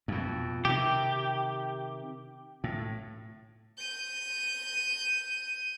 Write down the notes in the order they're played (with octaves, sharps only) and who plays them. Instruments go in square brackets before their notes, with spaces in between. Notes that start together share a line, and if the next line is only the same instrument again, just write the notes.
[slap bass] F2 B2
[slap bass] C3 D#3 [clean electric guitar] G4
[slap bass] A2
[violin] G6 D#7